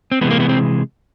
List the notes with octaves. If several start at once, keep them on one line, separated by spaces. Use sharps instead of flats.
C4
C3 E3 G#3 B3
A#3
B3
C4